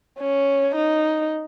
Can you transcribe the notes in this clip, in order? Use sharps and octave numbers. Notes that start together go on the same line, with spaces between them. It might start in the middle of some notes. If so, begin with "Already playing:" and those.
C#4
D#4